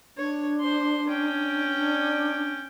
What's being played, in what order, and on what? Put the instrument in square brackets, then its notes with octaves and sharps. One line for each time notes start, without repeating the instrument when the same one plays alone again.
[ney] D4 [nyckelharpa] C#5
[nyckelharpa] C5 C6
C#4 G5
[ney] D4